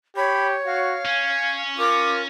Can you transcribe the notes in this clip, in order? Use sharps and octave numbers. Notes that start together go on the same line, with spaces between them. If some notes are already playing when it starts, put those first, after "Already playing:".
G4 C#5 B5
F#4 F5
C#4 G#6
F4 A#4 D6